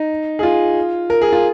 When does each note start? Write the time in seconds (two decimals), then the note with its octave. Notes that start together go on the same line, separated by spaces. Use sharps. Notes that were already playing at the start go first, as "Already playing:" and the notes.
Already playing: D#4
0.39 G#4
0.43 F4
1.10 A#4
1.22 G#4
1.32 F4